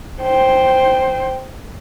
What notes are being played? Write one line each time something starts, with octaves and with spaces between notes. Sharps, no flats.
C5 G5